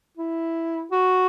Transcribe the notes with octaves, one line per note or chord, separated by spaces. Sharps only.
E4
F#4